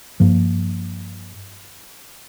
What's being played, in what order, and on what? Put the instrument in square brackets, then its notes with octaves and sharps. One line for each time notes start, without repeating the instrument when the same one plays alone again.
[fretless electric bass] G2 F3 A#3